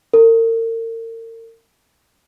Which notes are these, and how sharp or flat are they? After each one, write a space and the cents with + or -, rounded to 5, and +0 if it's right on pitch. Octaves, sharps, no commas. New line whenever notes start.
A#4 -40